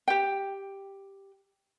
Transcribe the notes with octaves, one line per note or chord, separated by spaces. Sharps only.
G4 G5